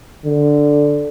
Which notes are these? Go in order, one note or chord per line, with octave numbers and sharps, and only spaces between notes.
D3